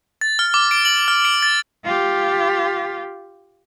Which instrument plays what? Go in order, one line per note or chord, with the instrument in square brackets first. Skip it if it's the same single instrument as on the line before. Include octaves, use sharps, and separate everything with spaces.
[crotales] A6
F6
D6
D7
F#7
F6
D7
A6
[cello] F4 G4